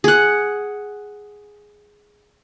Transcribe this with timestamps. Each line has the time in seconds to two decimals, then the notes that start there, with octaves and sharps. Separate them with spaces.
0.04 G#4 F#5